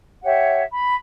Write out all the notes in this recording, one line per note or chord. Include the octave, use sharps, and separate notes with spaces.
G4 C#5 E5 F#5
B5